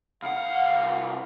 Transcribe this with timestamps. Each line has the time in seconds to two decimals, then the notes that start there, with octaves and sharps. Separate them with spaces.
0.23 C2 F5 F#5